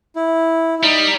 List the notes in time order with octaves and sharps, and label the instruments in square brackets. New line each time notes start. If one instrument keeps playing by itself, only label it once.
[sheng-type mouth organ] E4
E4
[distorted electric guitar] G3 [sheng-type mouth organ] D#4